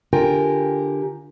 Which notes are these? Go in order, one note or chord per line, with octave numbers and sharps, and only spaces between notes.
D3 F4 G4 A#4 G5 G#5